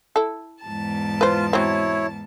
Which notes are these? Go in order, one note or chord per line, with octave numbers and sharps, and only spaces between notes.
E4 A4
E2 G#2 A5
F4 B4 C5
F#3 C4 E4 C#5